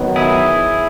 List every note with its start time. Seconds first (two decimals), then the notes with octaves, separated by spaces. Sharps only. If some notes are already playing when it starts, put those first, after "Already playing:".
Already playing: D#3 F#3 B3
0.16 E4 G#4